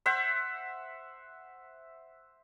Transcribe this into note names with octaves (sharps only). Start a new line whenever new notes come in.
C5 E5 F#5